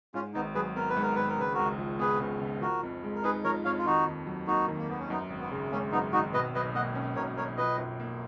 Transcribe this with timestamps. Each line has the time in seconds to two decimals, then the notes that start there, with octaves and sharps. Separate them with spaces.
0.14 G#2 C#4 F4
0.34 G#1 B3 D#4
0.55 F#3 G#4 B4
0.76 B3 A#4
0.89 B4
0.96 G#2
1.02 A#4
1.15 G#1 B4
1.28 A#4
1.38 C#3 B4
1.54 C#2 F#4 A#4
1.79 F3
1.99 B3 G#4 B4
2.20 C#3
2.41 C#2
2.61 F3 F#4 A#4
2.83 F2
3.04 G#3
3.15 A#4
3.24 D#4 G#4 B4
3.44 F3 A#4 C#5
3.65 F2 C#5 F5
3.79 F4
3.85 D#3 D#4 F#4
4.06 D#2
4.27 F#3
4.47 A#3 D#4 F#4
4.68 D#3
4.78 A#3
4.89 D#2 B3
4.99 C#4
5.09 F#2 B3 D#4
5.30 G#1
5.40 B3
5.51 C#3
5.71 G#3 A#3 C#4
5.92 F#2 B3 D#4
6.13 G#1 D#4 F#4
6.34 B2 B4 D#5
6.55 B1 B4 D#5
6.75 A#3 D#5 F#5
6.95 C#4
7.16 B2 A#4 C#5
7.37 B1 A#4 C#5
7.57 F3 B4 D#5
7.78 F#2
8.00 A#3